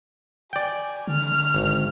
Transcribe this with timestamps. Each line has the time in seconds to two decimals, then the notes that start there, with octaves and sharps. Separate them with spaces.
0.53 D5 G5 G#5
1.07 D3 F6
1.54 G#1